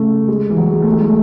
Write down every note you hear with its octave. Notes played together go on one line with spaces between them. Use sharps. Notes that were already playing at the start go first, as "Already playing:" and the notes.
Already playing: C#3 A3
G#3
E3
F#3
G#3
A3
G#3
A3